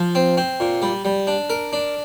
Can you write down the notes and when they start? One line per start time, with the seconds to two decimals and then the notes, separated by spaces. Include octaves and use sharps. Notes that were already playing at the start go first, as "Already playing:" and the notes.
Already playing: F3
0.15 C4
0.37 C4
0.60 A#2
0.82 G3
1.05 G3
1.27 D4
1.50 A#4
1.73 D4